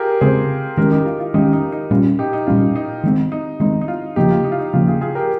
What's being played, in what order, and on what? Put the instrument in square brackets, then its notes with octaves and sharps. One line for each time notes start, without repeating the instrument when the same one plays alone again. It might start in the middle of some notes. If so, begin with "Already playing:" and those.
Already playing: [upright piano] F4 G4 G#4 A#4
[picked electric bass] C#3 G#3 C4 [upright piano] G#4 C5
[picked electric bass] D#3 G#3 C#4 [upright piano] G4 A#4
[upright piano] D#4 G4
F4
F4
[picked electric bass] D#3 G#3 C#4 [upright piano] D#4 G4
[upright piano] D#4
D#4
[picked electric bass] A#2 G3 C#4 [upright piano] F4
[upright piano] D#4 G4
D#4
[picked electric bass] A#2 G3 C#4 [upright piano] F4
[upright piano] D#4
[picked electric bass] D#3 G#3 C4
[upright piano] D#4
[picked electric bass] D#3 G#3 C4 [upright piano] D#4
[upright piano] D#4
F4
[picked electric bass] C#3 F3 A#3 [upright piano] D#4 G4
[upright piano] F4
D#4
F4
D#4
[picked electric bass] C#3 F3 A#3 [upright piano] F4
[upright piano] F4 G#4
F4 G#4
G4 A#4